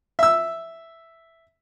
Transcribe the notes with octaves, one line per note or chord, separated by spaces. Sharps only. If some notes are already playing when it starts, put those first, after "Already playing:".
E5 E6